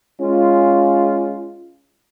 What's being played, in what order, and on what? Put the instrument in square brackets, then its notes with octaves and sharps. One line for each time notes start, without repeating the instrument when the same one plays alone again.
[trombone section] G#3 C#4 F4